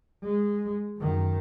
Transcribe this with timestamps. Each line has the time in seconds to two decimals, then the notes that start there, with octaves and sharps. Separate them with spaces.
0.24 G#3
0.98 F#2 D#3